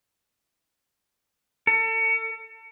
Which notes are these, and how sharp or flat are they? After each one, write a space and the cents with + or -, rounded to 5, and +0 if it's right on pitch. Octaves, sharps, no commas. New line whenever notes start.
A4 +35